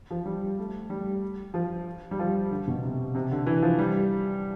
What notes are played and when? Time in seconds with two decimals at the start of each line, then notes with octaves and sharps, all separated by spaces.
0.11 F3
0.26 G3
0.59 A3
0.90 G3
1.54 F3
2.11 G3
2.19 F3
2.51 D3
2.67 B2
2.82 C3
3.15 C3
3.31 D3
3.46 E3
3.63 F3
3.79 G3